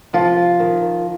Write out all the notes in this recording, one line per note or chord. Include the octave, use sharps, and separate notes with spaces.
C3 F3 F4
D#3